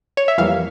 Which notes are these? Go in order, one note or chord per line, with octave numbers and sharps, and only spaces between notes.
C#5
E5
F2 E3 G3 A#3 F5